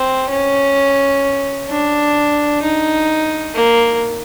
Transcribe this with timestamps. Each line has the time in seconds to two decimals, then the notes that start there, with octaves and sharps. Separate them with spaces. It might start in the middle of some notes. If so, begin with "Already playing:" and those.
Already playing: C4
0.30 C#4
1.69 D4
2.63 D#4
3.55 A#3